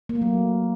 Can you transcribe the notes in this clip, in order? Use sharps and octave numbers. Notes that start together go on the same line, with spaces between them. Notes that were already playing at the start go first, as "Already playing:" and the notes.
A#3
A3
F#3